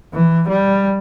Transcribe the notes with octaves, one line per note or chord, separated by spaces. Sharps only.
E3
G3